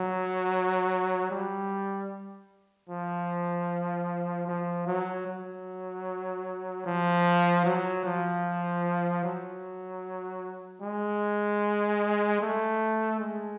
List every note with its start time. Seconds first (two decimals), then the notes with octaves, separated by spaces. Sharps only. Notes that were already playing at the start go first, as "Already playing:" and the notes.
Already playing: F#3
1.31 G3
2.89 F3
4.47 F3
4.87 F#3
5.27 F#3
6.86 F3
7.65 F#3
8.05 F3
9.24 F#3
10.82 G#3
12.41 A3
13.19 G#3